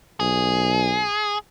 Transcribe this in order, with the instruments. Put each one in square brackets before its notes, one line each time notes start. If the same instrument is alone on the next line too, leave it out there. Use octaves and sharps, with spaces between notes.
[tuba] B1 [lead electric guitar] G#4